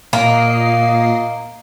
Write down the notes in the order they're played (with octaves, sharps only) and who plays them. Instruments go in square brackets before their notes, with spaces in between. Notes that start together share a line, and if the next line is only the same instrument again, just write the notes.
[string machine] A#2 D#5 C7 [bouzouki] A#3